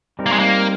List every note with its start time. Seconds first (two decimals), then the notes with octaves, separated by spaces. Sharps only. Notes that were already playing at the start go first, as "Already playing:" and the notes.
0.19 G3 C4 D#4 A#4
0.26 A#3
0.32 G#3
0.39 A#3